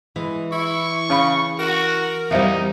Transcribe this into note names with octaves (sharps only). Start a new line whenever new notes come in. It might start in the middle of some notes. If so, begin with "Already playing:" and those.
E3 G#3
E4 C#6
C#3 C#4 F5 B5
F#4 A#4
E2 G3 D#4 C5 E5 F5